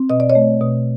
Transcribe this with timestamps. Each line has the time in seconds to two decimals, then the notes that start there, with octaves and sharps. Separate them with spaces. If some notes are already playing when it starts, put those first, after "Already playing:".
Already playing: C4
0.10 B2 D#5
0.20 D5
0.30 C#5 D#5
0.35 A3
0.61 B2